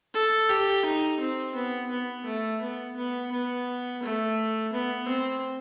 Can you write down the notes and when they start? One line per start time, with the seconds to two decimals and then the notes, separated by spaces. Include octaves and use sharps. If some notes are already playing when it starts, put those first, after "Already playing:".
0.14 A4
0.49 G4
0.85 D#4
1.20 C4
1.55 B3
1.91 B3
2.26 A3
2.61 B3
2.96 B3
3.32 B3
4.02 A3
4.73 B3
5.08 C4